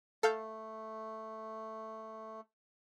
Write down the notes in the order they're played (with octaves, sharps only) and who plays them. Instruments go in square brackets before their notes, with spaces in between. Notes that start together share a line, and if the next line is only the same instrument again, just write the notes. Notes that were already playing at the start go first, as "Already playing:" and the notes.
[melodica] A3 [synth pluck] A4 F5 G6